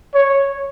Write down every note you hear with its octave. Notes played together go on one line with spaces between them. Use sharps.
C#5